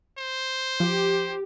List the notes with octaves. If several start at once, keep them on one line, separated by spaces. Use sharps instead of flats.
C5
F3 G4